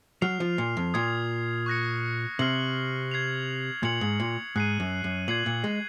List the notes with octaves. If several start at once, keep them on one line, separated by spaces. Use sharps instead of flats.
F#3 F6 C7 F7
F3
A#2
F2
A#2 D#6 G#6 C7
C#6 F#6 A#6 C#7
C3 F6 C7 F#7
G#6 C7 F7
A#2 G#6 C#7 F#7
G#2
A#2
G#2 F#6 C7 D#7
F#2
F#2
A#2 G#6 C7 F#7
A#2
G#3